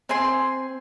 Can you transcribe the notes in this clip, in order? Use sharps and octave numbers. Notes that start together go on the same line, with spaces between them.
C4 G#5 C6